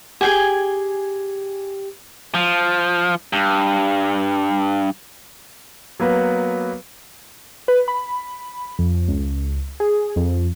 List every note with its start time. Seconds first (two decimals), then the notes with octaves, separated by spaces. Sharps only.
0.21 G4 G#4 G5 G#5
2.35 F3
3.33 G2
6.00 F#3 A#3 B3 B4
7.68 B4
7.88 B5
8.79 F2
9.08 C#2
9.80 G#4
10.16 F2